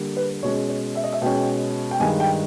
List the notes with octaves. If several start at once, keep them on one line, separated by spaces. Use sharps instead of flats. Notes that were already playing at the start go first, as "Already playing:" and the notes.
Already playing: D3 G3 A#3
B4
B2 G#3 C#4 C#5
C#5
E5
D#5
E5
B2 G#3 C#4 G5
G5
G2 D#3 G#3 G#5
G5